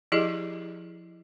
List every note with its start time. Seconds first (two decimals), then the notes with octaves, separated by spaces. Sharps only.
0.12 F3 E4 G4 G#4 D#5